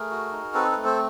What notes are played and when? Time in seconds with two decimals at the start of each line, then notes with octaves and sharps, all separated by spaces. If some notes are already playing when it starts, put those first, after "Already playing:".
Already playing: A3 G#4 A#4
0.11 F#4
0.32 D#4
0.54 C4 A4 B4
0.71 B4
0.77 A3
0.85 C5